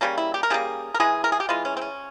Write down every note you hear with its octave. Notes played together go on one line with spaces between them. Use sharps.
C#3 G3 A#3 C#4
E4
G4
A#4
C#3 G3 A#3 G#4
A#4
E3 G#3 G#4
A#4
G#4
G4
E3 G#3 F4
C#4
C4
C#4